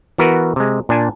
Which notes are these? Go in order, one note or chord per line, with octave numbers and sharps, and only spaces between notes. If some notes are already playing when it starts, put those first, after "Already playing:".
E3 B3 F#4 A#4 B4
C3 G#3
A#2 D4 G#5 A5